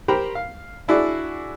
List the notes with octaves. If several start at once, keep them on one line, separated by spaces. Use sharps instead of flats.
G4 A#4 C5 G5 A#5 B5
F5
D4 E4 F#4 G#4 D5